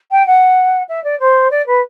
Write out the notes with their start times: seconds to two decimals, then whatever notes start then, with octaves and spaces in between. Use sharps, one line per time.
0.11 G5
0.26 F#5
0.88 E5
1.03 D5
1.19 C5
1.50 D5
1.66 B4